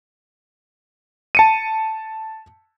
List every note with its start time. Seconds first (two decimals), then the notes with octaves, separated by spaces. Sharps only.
1.35 A5 C#7 D#7